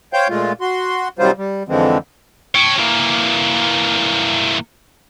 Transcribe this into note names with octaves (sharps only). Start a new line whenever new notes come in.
C5 C#5 F5 G5 G6
A#2 G#3 A3 F4
F#4 C6
C3 D#3 F#3 G3 F4 C5
G3
F2 D3 E3 F3 G#3 C4
C#5 G5
E3 A#3